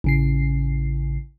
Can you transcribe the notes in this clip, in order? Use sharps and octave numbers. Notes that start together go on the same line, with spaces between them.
A1 C#3 C7